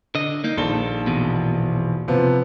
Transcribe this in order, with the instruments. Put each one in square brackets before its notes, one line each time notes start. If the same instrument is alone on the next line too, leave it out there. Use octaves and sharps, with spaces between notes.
[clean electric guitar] D3 D#5
A#3 D#4
[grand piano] A#1 D#3 G7 [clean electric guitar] A4
[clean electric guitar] E2 B2
[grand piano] C3 F3 B3